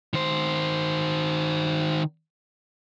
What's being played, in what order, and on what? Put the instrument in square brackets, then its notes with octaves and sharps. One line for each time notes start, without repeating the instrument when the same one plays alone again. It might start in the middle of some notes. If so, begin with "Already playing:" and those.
[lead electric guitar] D#3 C5